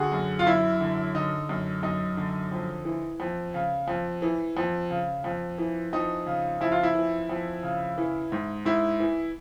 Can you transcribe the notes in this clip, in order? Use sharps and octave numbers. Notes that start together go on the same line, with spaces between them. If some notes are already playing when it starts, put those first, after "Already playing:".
Already playing: D3 F#4 G#4
F#2
F4
F#2 E4
D3
D3 D#4
F#2
F#2 D#4
D3
F2
E3
F2
C#3
F2
E3
F2
C#3
F2
E3
F2 D#4
C#3
F2 E4
F4
E4
E3
F2
C#3
E3
G#2
G#2 E4
E3